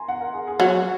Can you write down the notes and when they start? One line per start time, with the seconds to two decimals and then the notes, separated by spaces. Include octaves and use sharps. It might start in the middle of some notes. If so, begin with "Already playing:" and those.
Already playing: G#5 A#5 C6
0.08 F#5
0.21 A#4
0.34 G#4
0.47 G#4
0.60 F#3 F#4